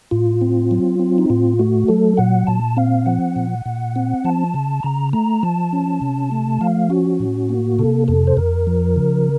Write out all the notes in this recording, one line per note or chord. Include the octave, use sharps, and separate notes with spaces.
A2 F4
C4
F#3
C4
D#4
A2 F4
A3 F#4
F#3 A4
A#2 F#5
A#2 A5
C4 F5
F3 F#5
A#2
A#2
C4
F3 A5
C#3
C#3 A#5
A3 A#5
F3 A5
C#4
C3
A3
F3 F5
C#4 F#4
A2
A#3
C3 A4
F2 A4
C5
F2 A#4
F3
C#3